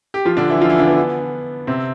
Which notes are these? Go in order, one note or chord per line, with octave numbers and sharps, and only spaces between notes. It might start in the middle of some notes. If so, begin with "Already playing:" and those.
G4
F3 F4
D3 D4
E3 E4
F3 F4
E3 E4
D3 D4
B3
C3 C4